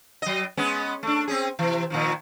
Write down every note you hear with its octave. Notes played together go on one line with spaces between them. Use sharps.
F#3 D#5
G#3 B3 C#4
A3 D4
C4 C#4 G#4
C3 E3
A#2 D#3 F3